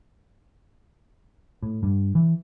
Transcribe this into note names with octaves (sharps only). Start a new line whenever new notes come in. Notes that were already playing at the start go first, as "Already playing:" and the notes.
A2
G2
E3